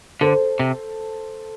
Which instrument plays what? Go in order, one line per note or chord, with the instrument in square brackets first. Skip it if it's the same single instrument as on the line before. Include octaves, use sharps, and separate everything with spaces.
[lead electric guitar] D3 [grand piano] A4 C5
[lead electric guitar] C3